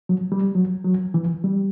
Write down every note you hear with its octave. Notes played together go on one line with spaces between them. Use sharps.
F#3
G3
F#3
F#3
E3
G3